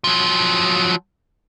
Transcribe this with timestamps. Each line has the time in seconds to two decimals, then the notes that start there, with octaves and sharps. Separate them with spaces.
0.04 F3 F#3